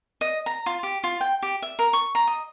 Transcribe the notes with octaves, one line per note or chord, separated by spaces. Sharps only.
D#5
A#5
F4
G4
F4
G5
G4
E5
A#4
C#6
A#5
D#5